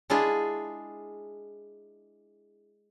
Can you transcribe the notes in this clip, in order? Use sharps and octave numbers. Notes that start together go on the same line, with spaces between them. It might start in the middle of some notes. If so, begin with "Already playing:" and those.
G#3 D4 E4 F4 G#4